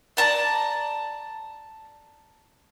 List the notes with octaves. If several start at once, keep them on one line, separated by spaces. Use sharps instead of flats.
D5 A5 A#5